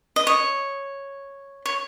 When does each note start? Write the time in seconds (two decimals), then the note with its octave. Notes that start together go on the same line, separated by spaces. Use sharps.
0.16 D#5
0.27 C#5
1.66 C#5